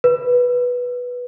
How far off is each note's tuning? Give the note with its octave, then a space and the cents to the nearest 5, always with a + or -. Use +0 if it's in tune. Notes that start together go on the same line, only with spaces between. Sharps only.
B4 -5